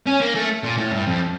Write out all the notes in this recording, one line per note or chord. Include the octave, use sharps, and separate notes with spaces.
C#4
A#3
A3
A#2
A2
G2
F2